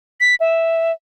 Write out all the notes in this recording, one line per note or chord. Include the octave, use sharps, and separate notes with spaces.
B6
E5